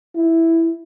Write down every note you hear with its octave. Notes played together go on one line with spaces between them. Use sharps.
E4